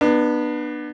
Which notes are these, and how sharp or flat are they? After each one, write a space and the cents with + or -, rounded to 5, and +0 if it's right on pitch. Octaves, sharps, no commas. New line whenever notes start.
B3 -15 D4 +35